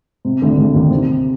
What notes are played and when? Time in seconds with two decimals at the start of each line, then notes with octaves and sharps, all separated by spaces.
0.25 C3
0.42 D2 D3
0.57 D2 D3
0.74 D#2 D#3
0.91 C3